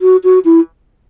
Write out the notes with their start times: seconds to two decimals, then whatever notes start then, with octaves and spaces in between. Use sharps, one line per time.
0.01 F#4
0.24 F#4
0.45 E4